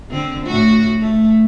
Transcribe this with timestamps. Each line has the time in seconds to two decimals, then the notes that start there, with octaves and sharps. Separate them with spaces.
0.11 D3 C4
0.46 A2 F#4
1.01 A3